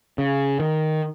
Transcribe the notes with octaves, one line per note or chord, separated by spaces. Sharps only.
C#3
D#3